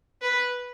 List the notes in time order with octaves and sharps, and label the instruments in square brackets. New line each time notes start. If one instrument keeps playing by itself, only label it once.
[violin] B4